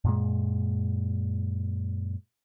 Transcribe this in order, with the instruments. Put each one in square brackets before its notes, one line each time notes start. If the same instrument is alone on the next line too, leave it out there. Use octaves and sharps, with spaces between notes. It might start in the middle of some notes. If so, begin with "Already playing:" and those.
[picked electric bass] F#2 A#2 G#3